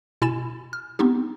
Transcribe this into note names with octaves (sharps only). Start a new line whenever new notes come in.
B2 E4 G#5 B5 A6 E7
F6
B3 C4 D#4 G4